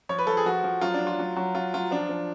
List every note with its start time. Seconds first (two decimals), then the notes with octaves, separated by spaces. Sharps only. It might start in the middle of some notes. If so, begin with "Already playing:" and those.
0.09 F3 C#5
0.18 B4
0.27 F3 A4
0.37 G#4
0.45 F3 F#4
0.64 F3
0.81 F#3 F4
0.94 D4
1.01 F#3
1.07 F4
1.19 F#3
1.36 F#3
1.55 F#3 F4
1.74 F#3 F4
1.91 F3 D4
2.09 F3